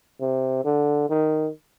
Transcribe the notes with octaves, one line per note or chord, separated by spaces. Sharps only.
C3
D3
D#3